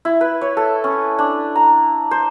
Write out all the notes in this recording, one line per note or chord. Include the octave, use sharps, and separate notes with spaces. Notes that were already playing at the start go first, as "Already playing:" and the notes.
E4
B4
C#5
A4
C#4
D4
A#5
C5